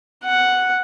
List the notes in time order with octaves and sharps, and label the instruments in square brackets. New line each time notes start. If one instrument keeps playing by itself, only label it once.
[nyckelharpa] F#5